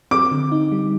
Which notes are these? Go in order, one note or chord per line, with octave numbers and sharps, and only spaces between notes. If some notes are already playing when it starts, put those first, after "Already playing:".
C4 D6
D3
D#4
G3